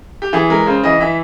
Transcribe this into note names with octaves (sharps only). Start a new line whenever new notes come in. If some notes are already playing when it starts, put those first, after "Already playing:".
G4
E3 G#4
G#3 A#4
C#3 C5
E3 D#5
E3 E5